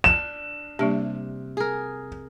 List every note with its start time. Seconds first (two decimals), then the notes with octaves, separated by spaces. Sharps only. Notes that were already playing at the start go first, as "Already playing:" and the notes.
0.04 D4 E7
0.79 C3 G3 A#3 D4
1.57 G#4 A#4